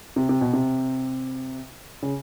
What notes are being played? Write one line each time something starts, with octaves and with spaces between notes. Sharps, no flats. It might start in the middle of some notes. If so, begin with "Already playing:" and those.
C3
C3
B2
C3
C#3